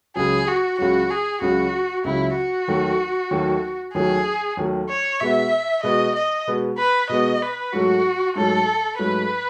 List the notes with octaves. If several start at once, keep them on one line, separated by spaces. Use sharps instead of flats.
C#2 C#3 F#3 G#4
F#4
C#2 C#3 F#3 F#4
G#4
C#2 C#3 F#3 F#4
C#2 C#3 F#3 E4
F#4
D#2 D#3 F#3 A3
D#2 D#3 F#3 A3
D#2 D#3 F#3 A3 G#4
D#2 D#3 F#3 A3
C#5
B2 G#3 B3 E5
B2 G#3 B3 D#5
D#5
B2 G#3 B3
B4
B2 G#3 B3 D#5
B4
G#2 F#3 A3 F#4
G#2 F#3 A3 A4
G#2 F#3 A3 B4